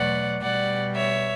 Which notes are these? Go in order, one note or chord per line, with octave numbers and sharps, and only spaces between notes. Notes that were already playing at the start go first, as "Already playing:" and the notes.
Already playing: E2 B2 F#3 A3 D5 F#5
B2 G3 D5 F#5
C#5 E5